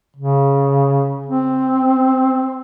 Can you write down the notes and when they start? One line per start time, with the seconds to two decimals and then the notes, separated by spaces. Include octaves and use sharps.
0.17 C#3
1.26 C4